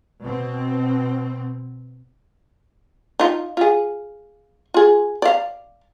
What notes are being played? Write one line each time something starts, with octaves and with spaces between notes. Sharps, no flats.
B2 C4
D#4 F4
F4 G#4
F4 G#4
D5 F5